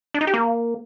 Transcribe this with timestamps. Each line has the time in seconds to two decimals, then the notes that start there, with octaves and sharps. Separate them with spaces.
0.14 D4
0.21 D#4
0.27 G4
0.34 A#3